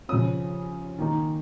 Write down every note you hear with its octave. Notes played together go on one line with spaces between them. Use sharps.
C#3 F3 C#4 D#6
D#3 A#3 D#4